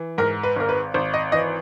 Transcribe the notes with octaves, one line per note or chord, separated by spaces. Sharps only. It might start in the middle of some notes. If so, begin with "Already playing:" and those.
Already playing: E3
G#2 A#4
B4
G#1 A#4
B4
G#1 C5
D#5
E3 D#5